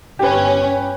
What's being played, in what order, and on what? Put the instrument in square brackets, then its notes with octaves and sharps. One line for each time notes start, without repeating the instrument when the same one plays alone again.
[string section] G1 C#4 [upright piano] G4 B4